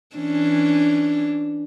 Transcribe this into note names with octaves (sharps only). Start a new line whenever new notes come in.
E3 C#4 D4